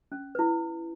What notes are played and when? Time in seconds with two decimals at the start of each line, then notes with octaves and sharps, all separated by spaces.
0.12 C#4
0.35 E4 B4